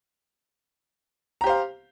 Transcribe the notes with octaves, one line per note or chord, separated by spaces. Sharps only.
G4 C5 F5 A#5